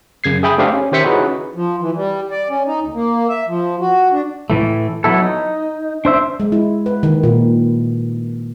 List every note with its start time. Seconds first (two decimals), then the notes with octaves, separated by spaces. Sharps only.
0.24 F#2 C#3 G#6 C7
0.43 G#4 E5 G5 B5 D#6
0.58 A3 D4 G4 C5 E5 F5
0.73 C#4
0.92 D#3 G4 C5 E5 B6 C#7
1.03 C#4 D#4 E4 F#4 G#4 B4
1.55 F3
1.82 E3
1.96 G3
2.31 D5
2.49 C#4
2.67 D#4
2.83 D2
2.94 A#3
3.29 E5
3.47 F3
3.81 F#4
4.12 D4
4.50 A2 E3 A3
5.04 F#3 B3 E4 A4
5.22 D#4
6.05 D4 C5 E5
6.40 G#3
6.52 E4
6.86 B4
7.03 D#3
7.23 A#2